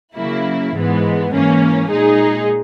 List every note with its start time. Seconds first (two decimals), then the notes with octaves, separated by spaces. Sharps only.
0.17 C#3 F#3 A#3 E4
0.74 G#2 E3 G#3 B3
1.31 G#2 E3 A#3 C#4
1.88 A#2 G#3 D#4 G#4